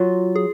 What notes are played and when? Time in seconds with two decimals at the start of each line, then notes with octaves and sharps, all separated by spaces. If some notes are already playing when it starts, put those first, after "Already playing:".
Already playing: F#3 F4
0.36 G#4